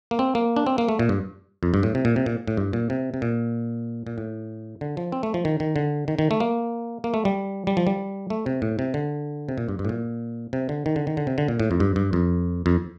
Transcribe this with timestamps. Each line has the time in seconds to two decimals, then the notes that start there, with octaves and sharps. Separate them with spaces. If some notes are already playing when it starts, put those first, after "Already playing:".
0.11 A#3
0.19 C4
0.35 A#3
0.56 D4
0.67 C4
0.78 A#3
0.89 A3
0.99 A#2
1.09 G2
1.63 F2
1.74 G2
1.83 A2
1.95 C3
2.05 A#2
2.16 C3
2.26 A#2
2.48 A2
2.57 G2
2.73 A#2
2.90 C3
3.14 C3
3.22 A#2
4.07 A#2
4.18 A2
4.81 D3
4.97 F3
5.12 C4
5.23 A3
5.34 F3
5.45 D#3
5.60 D#3
5.76 D3
6.08 D#3
6.19 D#3
6.31 A3
6.40 A#3
7.04 A#3
7.14 A3
7.25 G3
7.67 G3
7.77 F3
7.87 G3
8.30 A3
8.46 C3
8.62 A2
8.79 C3
8.94 D3
9.49 C3
9.58 A#2
9.68 G2
9.79 G2
9.85 A2
9.89 A#2
10.53 C3
10.69 D3
10.86 D#3
10.96 D3
11.07 D#3
11.17 D3
11.27 C3
11.38 D3
11.48 A#2
11.60 A2
11.71 F2
11.80 G2
11.96 G2
12.13 F2
12.66 F2